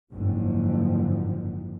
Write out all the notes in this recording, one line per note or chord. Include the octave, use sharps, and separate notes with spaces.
F#1 G#2 D3 F3